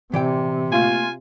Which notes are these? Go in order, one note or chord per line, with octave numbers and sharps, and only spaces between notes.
C3 E3 D5 G5
A3 A#3 F4 G#5